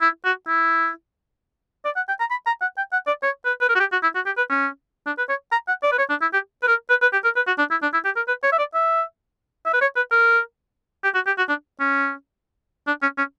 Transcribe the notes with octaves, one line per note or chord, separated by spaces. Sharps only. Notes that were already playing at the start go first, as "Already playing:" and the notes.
E4
F#4
E4
D5
F#5
G5
A#5
B5
A#5
F#5
G5
F#5
D5
C#5
B4
B4
A#4
F#4
G4
F#4
E4
F#4
G4
B4
C#4
D4
B4
C#5
A#5
F#5
D5
B4
C#5
D4
E4
G4
B4
A#4
B4
B4
G4
A#4
B4
F#4
D4
E4
D4
E4
G4
A#4
B4
C#5
E5
D5
E5
E5
B4
C#5
B4
A#4
G4
F#4
G4
F#4
D4
C#4
D4
C#4
C#4